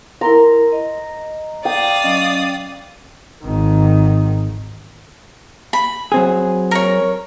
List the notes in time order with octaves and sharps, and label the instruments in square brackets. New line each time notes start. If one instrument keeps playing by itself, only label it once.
[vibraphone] E4 A#4 C6 [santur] A#5
[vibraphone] D#5
[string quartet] D5 F5 D#6 [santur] G5
[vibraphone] F#3 C#4 D#5
[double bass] G#1 D#3
[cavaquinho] B5
[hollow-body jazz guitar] F#3 C4 G#4
[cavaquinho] A#4 C#5